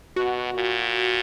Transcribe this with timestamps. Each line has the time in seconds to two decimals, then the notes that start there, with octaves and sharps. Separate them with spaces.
0.16 B2 F#4
0.54 A#2